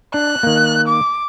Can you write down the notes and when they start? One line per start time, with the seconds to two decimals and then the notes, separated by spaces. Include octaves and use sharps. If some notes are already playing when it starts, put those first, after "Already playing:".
0.14 D4 F#6
0.43 D#3 A#3
0.87 D6